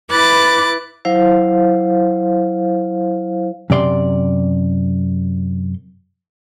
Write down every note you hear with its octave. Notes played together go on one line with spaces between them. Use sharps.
E4 B4 D6 F#6 A6
F#3 E4 C5 F5
F#2 C3 D5 C6